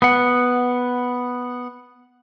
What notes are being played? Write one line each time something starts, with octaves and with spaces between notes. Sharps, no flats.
B3 F#5